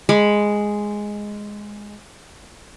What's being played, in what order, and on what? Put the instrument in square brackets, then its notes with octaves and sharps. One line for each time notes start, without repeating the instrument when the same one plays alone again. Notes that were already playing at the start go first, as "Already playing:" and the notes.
[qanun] G#3 B5